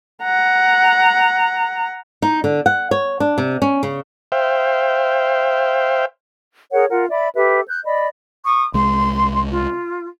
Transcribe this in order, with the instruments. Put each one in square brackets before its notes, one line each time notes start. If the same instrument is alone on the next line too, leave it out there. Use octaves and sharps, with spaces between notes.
[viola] F#5 A#5
[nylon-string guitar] D#4
D3
F#5
C#5
D4
C3
C#4
C#3
[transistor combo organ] C5 E5 F5 G5
[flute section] G#4 A#4 C#5 F#5
F4 A#4 F#5
D5 E5 B5
G4 A4 B4 E5
F#6 G6
D5 D#5 B5
C#6 D#6
[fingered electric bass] C2 G#3 [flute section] C6
[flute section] F4